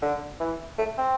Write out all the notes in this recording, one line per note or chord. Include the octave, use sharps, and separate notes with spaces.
D3
E3
A3
C4